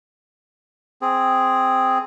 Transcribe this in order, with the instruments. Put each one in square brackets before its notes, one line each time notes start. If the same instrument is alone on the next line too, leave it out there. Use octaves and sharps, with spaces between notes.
[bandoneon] C4 G#4